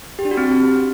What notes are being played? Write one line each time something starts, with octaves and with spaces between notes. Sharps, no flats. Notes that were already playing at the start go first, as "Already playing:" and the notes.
G4
D4
F#4
C4